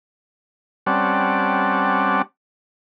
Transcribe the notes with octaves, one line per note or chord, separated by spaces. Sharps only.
G3 C4 C#4 D5 F#5 A5